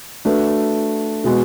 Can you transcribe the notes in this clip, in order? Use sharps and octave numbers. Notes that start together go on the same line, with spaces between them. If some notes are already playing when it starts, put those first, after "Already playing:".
A3 D4 F#4 B4
B2 G#3 B3 F#4